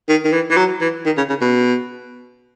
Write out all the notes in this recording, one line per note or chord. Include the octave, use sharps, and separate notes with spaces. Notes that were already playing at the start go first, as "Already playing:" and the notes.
D#3
D#3
E3
E3
F#3
E3
D#3
C#3
C#3
B2